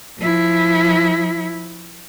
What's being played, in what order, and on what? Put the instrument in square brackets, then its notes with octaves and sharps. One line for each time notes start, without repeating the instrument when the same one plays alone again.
[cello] F3 E4